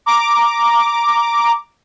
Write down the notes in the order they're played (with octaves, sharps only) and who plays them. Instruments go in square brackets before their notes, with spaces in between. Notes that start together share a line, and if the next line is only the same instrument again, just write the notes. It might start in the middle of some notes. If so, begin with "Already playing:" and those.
[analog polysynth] A#5 D6